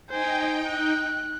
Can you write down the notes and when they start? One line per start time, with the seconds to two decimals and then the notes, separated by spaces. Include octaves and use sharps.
0.10 D#4 C5 G5 G#5
0.69 F#6